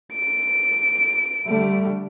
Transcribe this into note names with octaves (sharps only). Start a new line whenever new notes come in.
D7
D3 G3 A3